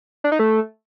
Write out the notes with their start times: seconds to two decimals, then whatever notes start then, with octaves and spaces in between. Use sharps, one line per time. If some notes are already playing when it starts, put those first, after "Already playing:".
0.24 D4
0.32 D#4
0.39 A3